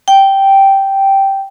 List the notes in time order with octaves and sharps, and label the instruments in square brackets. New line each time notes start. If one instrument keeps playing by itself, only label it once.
[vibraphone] G5